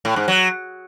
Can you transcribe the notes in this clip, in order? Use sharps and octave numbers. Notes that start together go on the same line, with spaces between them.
A2
G#2
F#3